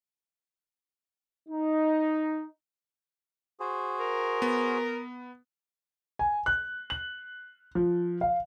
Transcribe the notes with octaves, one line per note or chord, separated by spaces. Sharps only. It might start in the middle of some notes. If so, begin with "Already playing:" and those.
D#4
F#4 G#4 C5
A#4
B3
G#5
F#6
F#7
F3
F5